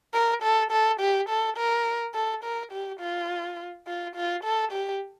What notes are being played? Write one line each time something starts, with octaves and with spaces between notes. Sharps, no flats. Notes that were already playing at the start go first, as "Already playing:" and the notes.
A#4
A4
A4
G4
A4
A#4
A4
A#4
G4
F4
F4
F4
A4
G4